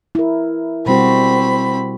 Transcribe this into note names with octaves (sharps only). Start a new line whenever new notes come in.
E4 A#4
B2 G3 C4 F#4 B5